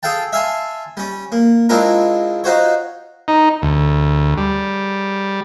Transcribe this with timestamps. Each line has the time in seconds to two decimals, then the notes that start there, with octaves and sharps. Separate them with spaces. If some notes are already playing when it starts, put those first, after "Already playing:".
0.03 G#4 A4 F5 G5 A5
0.33 E5 F5 G#5 A5 C6
0.97 G3 C#4
1.32 A#3
1.69 G#3 C4 D4 E4 F4 A#4
2.44 D#4 F4 F#4 C5 C#5
3.28 D#4
3.62 D2
4.37 G3